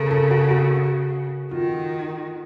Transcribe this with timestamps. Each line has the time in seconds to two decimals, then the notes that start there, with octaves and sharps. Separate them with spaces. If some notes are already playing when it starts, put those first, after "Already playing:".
Already playing: C#3 A4 A#4
0.11 A4
0.31 F#4
0.51 F#4
1.51 D#3 F4